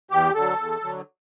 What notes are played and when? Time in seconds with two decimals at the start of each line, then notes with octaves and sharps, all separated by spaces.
0.11 E2 G4
0.35 D3 F#3 A4
0.58 E2
0.82 D3 F#3